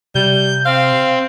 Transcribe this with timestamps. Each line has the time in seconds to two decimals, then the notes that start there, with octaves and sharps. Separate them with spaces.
0.15 C3 G3 G6
0.66 C4 F5